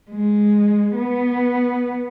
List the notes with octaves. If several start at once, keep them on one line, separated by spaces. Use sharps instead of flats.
G#3
B3